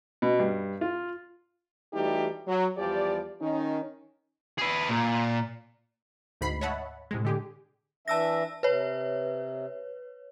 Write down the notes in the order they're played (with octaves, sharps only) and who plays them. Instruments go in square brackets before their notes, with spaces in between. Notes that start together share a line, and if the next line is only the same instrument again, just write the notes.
[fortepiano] B2
G2
F4
[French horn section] E3 G3 A3 D#4 F#4 G4
F#3
E2 F3 G3 G4 D5
D#3 C#4 D#4
[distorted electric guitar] G#4 B4
A#2
[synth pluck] D2 G#2 B5 B6 C7
C#5 D#5 E5 F#5 A5 B5
A2 C3 G#3
D3 G4 G#4
[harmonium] E3 D4 E5 [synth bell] A5 E6 A#6
[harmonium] C3 [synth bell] B4 C#5